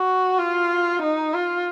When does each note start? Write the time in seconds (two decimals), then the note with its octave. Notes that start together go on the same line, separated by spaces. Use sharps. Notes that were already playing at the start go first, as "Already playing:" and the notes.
Already playing: F#4
0.39 F4
1.02 D#4
1.34 F4